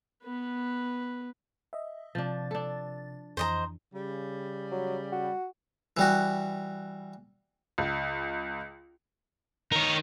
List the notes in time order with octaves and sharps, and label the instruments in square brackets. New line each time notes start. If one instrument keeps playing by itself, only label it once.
[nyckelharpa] B3 B4
[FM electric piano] D#5 E5
[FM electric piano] C3 A6 [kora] F3 D4
[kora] D4 A4
[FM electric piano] F2 E3 [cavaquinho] C5 D#5 A#5
[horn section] C#3 G3
[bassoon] F#3
F#4
[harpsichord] E3 G3 F#4
[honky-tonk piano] C#2
[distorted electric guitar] D#3 A#4 [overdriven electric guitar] D#4 C#5